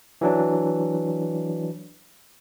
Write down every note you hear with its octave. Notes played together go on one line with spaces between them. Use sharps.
E3 F#3 D4